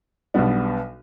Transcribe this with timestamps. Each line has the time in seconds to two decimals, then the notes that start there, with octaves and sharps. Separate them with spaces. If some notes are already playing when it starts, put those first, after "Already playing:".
0.34 B1 B2 G3 B3 D4